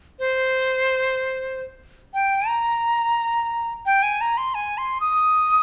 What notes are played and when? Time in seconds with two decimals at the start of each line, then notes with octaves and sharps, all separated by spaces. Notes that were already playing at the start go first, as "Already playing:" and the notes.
0.19 C5
2.14 G5
2.48 A#5
3.86 G5
4.03 G#5
4.21 A#5
4.38 C6
4.55 G#5
4.78 C6
5.00 D#6